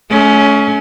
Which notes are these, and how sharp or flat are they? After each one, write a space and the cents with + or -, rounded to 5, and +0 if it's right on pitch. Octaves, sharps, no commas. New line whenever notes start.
A3 -35 C#4 +20